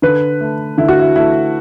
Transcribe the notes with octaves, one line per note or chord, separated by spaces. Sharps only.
D3 B4
A3
D3 E4
F#4
E4
A3 E4